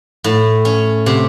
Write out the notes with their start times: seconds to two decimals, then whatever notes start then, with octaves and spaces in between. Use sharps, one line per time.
0.24 A2
0.65 C#4
1.06 C3